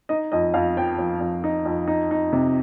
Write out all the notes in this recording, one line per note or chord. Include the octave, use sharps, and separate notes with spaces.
D#4 D#5
F2 D#5
F2 F5
F3 G5
F3
F2
D#4
F2
D#4
D#4
C3